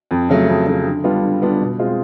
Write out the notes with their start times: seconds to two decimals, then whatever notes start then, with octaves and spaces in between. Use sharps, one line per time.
0.11 F2
0.29 C#3 F#3 A3
0.48 F2
0.66 C#3 F#3 A3
0.86 D3
1.04 G3 B3 D4 F4
1.23 D3
1.42 G3 B3 D4 F4
1.60 B2
1.79 G#3 C4 F4